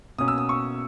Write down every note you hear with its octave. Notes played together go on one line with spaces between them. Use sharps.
B2 A#3 C#4 D#6
E6
D#6
C#6